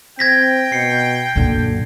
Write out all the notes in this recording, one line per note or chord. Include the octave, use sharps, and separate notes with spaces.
C4 G5 G#6 A#6 B6
B2 C7 C#7
F#2 A#2 D3